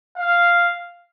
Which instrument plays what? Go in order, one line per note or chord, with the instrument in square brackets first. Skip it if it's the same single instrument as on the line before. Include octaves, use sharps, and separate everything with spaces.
[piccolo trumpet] F5